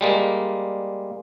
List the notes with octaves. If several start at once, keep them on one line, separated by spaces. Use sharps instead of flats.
G3 G#3 A#3